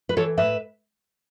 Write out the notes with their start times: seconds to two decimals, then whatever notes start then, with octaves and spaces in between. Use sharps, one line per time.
0.09 B4
0.17 E3 A4 C#5
0.38 A2 B4 E5